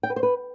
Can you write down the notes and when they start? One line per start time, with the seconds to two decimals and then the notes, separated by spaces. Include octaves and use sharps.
0.03 G5
0.10 B4
0.16 C5
0.23 B4